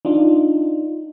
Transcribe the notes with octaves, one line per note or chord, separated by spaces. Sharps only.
D4 D#4 F4